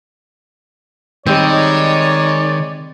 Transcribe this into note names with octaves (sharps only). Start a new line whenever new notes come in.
D#3 G3 G#3 C4 D#4 C#5 D5